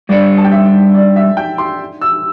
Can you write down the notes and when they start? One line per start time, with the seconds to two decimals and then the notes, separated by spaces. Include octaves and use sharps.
0.09 G2 G3 D4 A4 D5
0.38 A5
0.45 G5
0.52 E5
0.94 D5
1.16 E5
1.37 G5
1.58 C6
2.01 E6